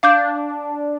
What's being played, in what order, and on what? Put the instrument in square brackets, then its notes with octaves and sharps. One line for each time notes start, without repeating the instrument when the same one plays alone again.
[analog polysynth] D4 [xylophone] F5 D6 G6